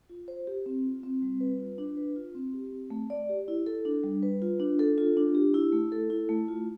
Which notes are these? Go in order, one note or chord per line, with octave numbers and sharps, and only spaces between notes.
F4
C5
G4
C4
F4
C4
G3
B4
F4
D4
B4
F4
C4
G4
C4
A3
D5
G4
E4
A4
D4
G3
B4
F4
D4
A4
F4
D4
G4
E4
A3
A4
E4
A3
F4